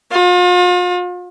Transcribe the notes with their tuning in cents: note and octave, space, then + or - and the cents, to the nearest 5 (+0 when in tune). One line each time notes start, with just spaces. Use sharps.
F4 +40